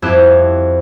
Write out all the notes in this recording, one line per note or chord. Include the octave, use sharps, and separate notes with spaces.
F2 C4 E4 G4 F#6 E7